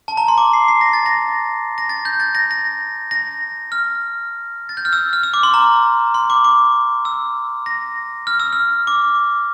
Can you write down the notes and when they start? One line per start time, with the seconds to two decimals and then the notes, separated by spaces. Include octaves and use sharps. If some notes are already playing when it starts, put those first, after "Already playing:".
0.08 A5
0.17 A#5
0.28 C6
0.38 D6
0.53 C7
0.68 C7
0.81 A#6
0.93 A6
1.06 A#6
1.78 A#6
1.89 A6
2.05 G6
2.20 A6
2.35 A#6
2.51 A#6
3.11 A#6
3.72 F6
4.69 A6
4.77 G6
4.85 F6
4.93 E6
5.13 F6
5.23 E6
5.34 D6
5.43 C6
5.54 A#5
6.14 C6
6.30 D6
6.44 D6
7.05 E6
7.66 A#6
8.27 F6
8.40 E6
8.53 F6
8.87 D6